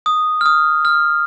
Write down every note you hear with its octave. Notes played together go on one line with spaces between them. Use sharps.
D#6
F6
D#6
F6